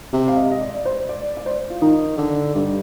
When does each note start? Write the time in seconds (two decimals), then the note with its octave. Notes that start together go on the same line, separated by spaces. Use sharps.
0.13 C3
0.28 F5
0.36 D#5
0.51 D#5
0.61 D5
0.86 C5
1.09 D5
1.37 D5
1.46 C5
1.70 F4
1.81 D#3 D#4
2.18 D3
2.55 G2